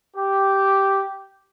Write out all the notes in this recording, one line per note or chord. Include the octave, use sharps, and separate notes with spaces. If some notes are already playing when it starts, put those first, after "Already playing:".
G4